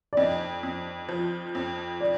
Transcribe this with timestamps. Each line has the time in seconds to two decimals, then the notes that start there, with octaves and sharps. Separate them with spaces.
0.13 D5
0.17 F2 D#5
0.63 F2
1.09 F3
1.55 F2
2.00 D5